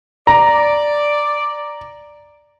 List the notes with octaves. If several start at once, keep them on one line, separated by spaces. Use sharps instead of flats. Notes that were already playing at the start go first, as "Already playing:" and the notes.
D5 A#5